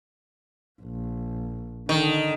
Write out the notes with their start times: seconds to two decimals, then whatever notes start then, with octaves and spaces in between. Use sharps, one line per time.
0.82 A#1
1.89 D3 D#3